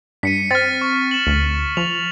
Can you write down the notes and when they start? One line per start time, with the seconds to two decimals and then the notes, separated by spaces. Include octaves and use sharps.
0.23 G2 B6 C#7 D#7
0.51 C4 F6 A6
0.81 C#6
1.11 E7 F#7
1.27 D2
1.77 F3 F7